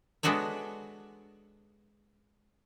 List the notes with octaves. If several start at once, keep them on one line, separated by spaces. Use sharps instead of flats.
G#3 B3 D4 F#4 A4 C#5